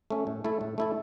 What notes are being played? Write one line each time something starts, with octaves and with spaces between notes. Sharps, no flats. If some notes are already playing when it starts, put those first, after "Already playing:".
A3 C#4
A2
A3 E4 A4
A2
A3 E4 A4